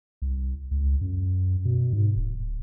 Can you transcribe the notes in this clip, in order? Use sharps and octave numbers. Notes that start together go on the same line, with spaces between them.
C2
C#2
F#2
B2
G#2
D1